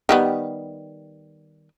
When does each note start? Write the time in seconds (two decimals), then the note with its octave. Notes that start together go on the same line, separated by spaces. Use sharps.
0.09 D#3 G3 B3